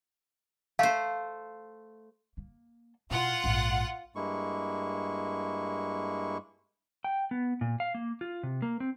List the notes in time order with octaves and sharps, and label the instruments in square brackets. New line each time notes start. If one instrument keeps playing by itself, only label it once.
[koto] A3 C5 [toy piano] F5
[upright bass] A#3
[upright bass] B2 E4 [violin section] F4 F#5
[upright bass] A#1 G#2
[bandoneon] G2 G#3 A#3 E4 C#6
[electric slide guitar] G5
B3
A#2
F5
A#3
F4
C3
A#3
C4